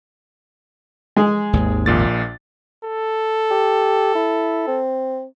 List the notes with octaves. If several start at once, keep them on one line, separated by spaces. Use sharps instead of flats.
G#3 G#4
G#1 D#2
A#1 A#2 A6
A4
G4
E4
C4